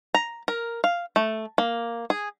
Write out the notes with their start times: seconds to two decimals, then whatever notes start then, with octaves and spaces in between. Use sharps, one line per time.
0.14 A#5
0.48 A#4
0.84 F5
1.16 A3
1.58 A#3
2.10 G#4